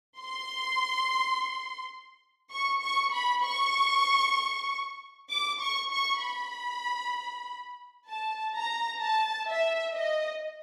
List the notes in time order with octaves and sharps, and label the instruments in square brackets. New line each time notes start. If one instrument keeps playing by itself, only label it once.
[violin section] C6
C#6
C#6
B5
C#6
D6
C#6
C#6
B5
A5
A#5
A5
E5
D#5